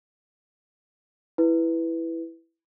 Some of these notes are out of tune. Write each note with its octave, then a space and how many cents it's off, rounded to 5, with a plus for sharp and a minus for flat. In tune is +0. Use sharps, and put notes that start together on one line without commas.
E4 +0 B4 +0